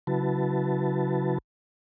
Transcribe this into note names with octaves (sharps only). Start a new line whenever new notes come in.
C#3 F#3 E4 F#4 B4 A5